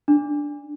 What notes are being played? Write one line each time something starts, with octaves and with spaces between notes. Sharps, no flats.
D4